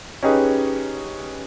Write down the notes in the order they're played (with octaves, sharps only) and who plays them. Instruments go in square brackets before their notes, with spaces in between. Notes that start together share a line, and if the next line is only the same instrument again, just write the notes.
[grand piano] C#4 D#4 G4 G#4 B4